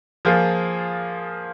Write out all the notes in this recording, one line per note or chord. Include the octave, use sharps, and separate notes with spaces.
F3 A#3 F4 G#4